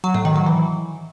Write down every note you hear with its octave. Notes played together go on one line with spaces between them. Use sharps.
F#3
A2
D#3
F#3
E3